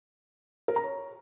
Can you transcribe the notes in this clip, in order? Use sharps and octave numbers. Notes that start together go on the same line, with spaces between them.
A#4
A#5
C#5